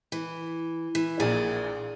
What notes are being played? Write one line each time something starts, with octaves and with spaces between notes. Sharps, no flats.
E3
E3
A#1 A#2 G#4 D5